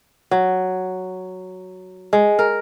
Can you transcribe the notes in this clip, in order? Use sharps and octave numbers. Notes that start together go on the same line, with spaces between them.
F#3
G#3
A#4